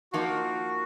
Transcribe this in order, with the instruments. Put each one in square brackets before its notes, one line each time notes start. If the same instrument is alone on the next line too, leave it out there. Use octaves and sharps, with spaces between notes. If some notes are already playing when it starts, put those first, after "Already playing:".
[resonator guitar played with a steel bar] F3 A#3 D#4 A#4 [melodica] F#4